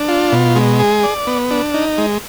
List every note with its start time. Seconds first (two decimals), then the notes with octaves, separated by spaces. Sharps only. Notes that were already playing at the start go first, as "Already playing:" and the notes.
Already playing: D4
0.09 F4
0.32 B2
0.56 G#3
0.79 G#4
1.03 D5
1.27 B3
1.51 D4
1.74 D#4
1.98 G#3